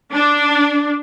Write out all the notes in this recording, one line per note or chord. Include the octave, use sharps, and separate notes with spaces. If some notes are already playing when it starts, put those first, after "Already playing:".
D4